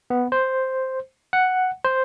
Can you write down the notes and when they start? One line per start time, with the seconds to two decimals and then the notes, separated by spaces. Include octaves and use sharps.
0.10 B3
0.32 C5
1.33 F#5
1.84 C5